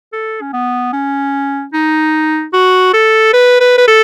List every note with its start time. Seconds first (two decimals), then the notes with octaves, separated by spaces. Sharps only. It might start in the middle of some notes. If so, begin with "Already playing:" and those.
0.13 A4
0.41 C#4
0.53 B3
0.93 C#4
1.73 D#4
2.53 F#4
2.94 A4
3.33 B4
3.61 B4
3.78 B4
3.88 A4